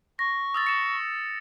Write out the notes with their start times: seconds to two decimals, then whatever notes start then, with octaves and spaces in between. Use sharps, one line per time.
0.19 C#6 A#6
0.54 D#6 E6 A6
0.67 C#7 E7